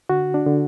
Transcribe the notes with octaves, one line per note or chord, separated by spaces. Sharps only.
D3 F#4
D4
D3